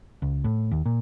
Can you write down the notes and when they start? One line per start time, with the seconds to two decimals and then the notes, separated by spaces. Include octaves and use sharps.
0.22 C#2
0.44 A2
0.71 D#2
0.86 A#2